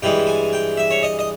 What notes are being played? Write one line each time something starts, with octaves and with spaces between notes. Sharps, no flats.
G2 E3 G#3 G5
G#5
G5
E5
C#5
D#5
D#5